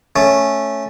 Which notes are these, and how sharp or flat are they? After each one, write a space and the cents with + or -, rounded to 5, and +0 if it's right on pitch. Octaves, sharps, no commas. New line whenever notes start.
A3 +0 C#4 +0